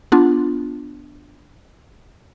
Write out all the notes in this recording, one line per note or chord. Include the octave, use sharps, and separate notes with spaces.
B3 D4 F4